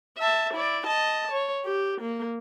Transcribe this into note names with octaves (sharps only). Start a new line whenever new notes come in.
E5 A5
E4 D5
D#5 A5
C#5
G4
A#3